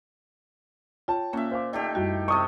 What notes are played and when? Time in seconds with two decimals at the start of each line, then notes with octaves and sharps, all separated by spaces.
1.08 F4 C#5 G5 A5
1.33 A#2 A#3 C#4 E5
1.51 C5 F5 D6
1.73 D#3 A3 G4 D5
1.95 F#2 G3 E4 F#4
2.28 C3 A3 C#6 D#6